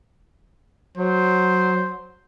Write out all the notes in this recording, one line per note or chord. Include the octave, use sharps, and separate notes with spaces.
F#3 C5